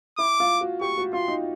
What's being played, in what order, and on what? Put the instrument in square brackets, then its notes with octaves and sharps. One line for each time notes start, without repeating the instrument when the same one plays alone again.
[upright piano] E4 [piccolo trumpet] D6
[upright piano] F4
F#4
[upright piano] G4 [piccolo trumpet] C#6
[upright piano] F#4
[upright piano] F4 [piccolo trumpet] C6
[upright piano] D#4